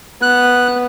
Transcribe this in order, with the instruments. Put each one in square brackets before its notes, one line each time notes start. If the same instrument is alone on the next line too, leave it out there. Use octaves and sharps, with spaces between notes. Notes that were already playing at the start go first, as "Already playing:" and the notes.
[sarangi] B3 [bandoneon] F#6